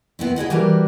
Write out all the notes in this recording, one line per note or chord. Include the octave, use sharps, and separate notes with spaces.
B3 C4 E4
E4 G#4 D#5 F#5
E3 G3 D4 F#4 A#4